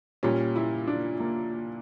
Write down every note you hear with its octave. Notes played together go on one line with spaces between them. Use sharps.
A#2 G3 C#4
E4
D4
A#3